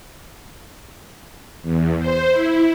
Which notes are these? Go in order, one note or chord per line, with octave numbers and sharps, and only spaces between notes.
E2
C5
E4